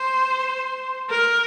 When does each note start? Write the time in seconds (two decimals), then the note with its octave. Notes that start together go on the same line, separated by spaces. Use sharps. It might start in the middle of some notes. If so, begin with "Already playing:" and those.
Already playing: C5
1.10 A#4